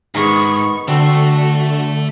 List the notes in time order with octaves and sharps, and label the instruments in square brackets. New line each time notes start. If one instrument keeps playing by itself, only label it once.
[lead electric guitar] G#2 [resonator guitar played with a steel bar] D#3 G#3 B3 [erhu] C#6
[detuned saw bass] D3 [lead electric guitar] A3 A4 [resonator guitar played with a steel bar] C4 [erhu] F#4